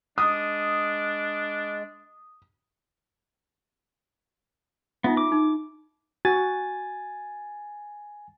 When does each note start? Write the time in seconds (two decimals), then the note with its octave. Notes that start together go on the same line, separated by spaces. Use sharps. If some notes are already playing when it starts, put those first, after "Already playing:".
0.18 G#3 D4 D#6
5.04 B3 D#4 F4 E5
5.17 D6
5.32 D#4
6.25 F#4 G#5 A6